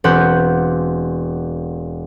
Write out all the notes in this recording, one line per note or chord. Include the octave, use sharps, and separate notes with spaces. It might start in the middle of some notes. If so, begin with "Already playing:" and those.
E1 C4 F#5 G6